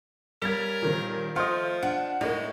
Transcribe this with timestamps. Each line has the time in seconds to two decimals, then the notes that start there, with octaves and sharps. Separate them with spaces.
0.42 G3 C#4 F4 A#4 G#6 A6 B6
0.82 A#2 D#3 C4
1.36 F3 A3 F4 D#5 F6 G6
1.83 D4 F#5
2.21 A2 G#3 A#3 D#4